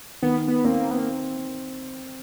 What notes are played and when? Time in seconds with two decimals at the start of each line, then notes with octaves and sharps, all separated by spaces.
0.22 D#3 B3
0.48 B3
0.65 A#3 C4
0.91 B3
0.99 A#3